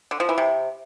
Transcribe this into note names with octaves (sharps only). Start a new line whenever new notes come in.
D3
F3
E3
C3